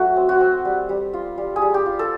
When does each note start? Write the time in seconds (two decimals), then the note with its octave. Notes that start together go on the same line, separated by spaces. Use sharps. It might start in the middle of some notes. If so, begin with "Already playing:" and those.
Already playing: F#3 A3 F#4
0.17 C4
0.29 F#4
0.41 C4
0.65 G3
0.89 G3
1.13 F4
1.38 G3
1.56 G#4
1.62 G3
1.74 G4
1.86 F4
1.99 A4